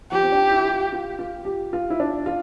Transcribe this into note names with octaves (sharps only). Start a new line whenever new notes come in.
F3 G4
C4
D4
E4
F4
F4
F4
G4
F4
E4
D4
F4